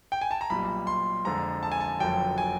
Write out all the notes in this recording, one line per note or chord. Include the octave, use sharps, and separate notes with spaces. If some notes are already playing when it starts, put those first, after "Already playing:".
G5
G#5
A5
A#5
B1 A#2 G3 B5
C6
F2 D3 F3 G#3 A#5
A5
G#5
A5
F#1 F2 D3 F#3 G5
G#5